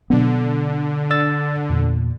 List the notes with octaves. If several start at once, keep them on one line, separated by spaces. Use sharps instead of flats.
B2 D3 F#3 B3
D5 E6 A6
E2 A#2